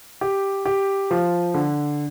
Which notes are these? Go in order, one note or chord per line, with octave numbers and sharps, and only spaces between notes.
G4
G4
F3
D3